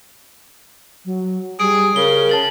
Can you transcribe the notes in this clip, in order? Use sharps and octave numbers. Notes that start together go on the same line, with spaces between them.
F#3
G3 G#4 D7
C#3 A#4 G7
A5 A6 F#7